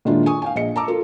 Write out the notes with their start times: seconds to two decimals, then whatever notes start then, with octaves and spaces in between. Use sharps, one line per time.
0.05 A#2 D#3 G#3 D4 E4 F4
0.26 G#5 C#6 D#6
0.42 F5 G5 G#5
0.55 A#1 D#5 C#7
0.76 A5 A#5 D6 E6
0.88 F4 A4 A#4